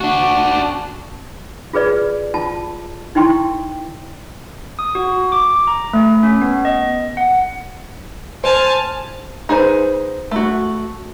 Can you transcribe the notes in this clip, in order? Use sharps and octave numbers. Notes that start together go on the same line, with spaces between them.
D4 F#4
F4 G#4 B4 D5
F4 A5
D#4 E4 G5 C6 C#6
D#6
F#4
D6
A#5
A3
C#4
B3
D#5
F#5
C5 G#5 A5 F6
D#4 G#4 B4 C5
A3 F#4